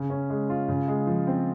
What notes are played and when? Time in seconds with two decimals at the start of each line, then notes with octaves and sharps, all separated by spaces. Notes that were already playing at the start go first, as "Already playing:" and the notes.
Already playing: C#3
0.10 C#4
0.30 G#3
0.49 F4
0.68 C#3
0.88 G#3
1.07 F3
1.27 C4